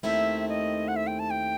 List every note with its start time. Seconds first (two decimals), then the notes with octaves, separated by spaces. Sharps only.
0.03 D#2 D#3 A3 C4 E4 E5
0.49 D#5
0.88 F#5
0.96 E5
1.07 G5
1.19 A5
1.30 G5